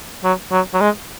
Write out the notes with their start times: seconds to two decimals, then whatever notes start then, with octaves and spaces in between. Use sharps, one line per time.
0.24 F#3
0.51 F#3
0.74 F#3
0.80 G#3